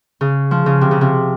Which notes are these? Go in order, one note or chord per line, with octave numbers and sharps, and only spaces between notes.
C#3
F3
C#3
C3
C#3
C3